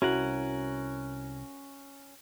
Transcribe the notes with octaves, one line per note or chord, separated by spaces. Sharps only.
C2 F2 C#4 E4 F#4 A#4 F#5